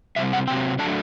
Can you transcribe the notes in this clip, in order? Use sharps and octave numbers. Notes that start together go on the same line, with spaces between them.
C3 G3 C4 E5
F#5
C3 F#3 C4 G5
F#3 A3 D4 A5